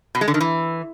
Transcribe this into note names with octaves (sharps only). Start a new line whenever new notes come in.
B2
G#3
D3
D#3
E3